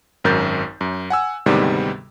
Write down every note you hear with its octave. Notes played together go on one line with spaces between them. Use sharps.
G#1 F#2 A#4 G6 A6
F#2
F#5 G#5 E6
D2 G#2 C3 D#3 G3 B3